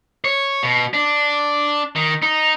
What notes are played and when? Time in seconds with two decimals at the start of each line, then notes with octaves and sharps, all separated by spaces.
0.25 C#5
0.63 B2
0.94 D4
1.96 D#3
2.23 D#4